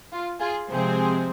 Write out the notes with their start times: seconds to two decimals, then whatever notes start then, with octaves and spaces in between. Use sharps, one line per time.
0.12 F4
0.41 F4 G#4
0.70 C3 F3 G#3 C4 G#4 C5